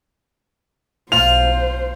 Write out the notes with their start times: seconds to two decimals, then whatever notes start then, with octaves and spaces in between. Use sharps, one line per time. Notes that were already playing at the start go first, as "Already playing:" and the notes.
1.12 B1 F4 C5 F7